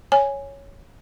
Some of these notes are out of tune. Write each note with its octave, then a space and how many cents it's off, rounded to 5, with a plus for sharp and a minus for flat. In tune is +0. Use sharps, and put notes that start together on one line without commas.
C#5 +0 G#5 -5